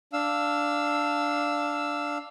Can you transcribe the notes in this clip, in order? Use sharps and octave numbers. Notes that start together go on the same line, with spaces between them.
D4 F5 E6